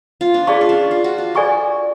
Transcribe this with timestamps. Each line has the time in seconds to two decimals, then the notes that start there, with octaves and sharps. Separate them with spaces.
0.21 F4
0.34 D4
0.47 C#4 G#4 D5 F5 A5 C#6
0.61 F4
0.69 D4
0.91 F4
1.04 F#4
1.18 F4
1.35 F#4 A4 D5 G#5 C#6